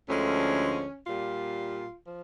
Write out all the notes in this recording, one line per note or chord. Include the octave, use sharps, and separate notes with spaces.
D2 D3 F3 G#3 C#4
A#2 G3 F4
F3